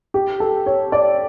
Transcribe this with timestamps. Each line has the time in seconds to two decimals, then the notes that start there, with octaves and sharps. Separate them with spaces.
0.14 G4
0.40 A4
0.66 C#5
0.92 D5